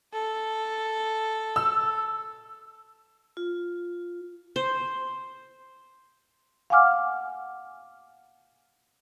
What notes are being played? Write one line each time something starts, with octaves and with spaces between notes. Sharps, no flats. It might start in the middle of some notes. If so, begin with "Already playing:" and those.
A4
E6
F4
C5
F5 F#5 G#5 D6 F6